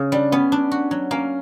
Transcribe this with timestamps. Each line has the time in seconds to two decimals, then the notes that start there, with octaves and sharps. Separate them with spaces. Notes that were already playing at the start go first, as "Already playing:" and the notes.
Already playing: C#3
0.12 G3 D4
0.32 B3 C#4
0.52 D4
0.71 F#4
0.91 F#3
1.11 A#3 C#4